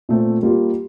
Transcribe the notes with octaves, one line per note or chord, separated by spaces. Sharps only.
A#2 A3 C4
G3 A#3 F4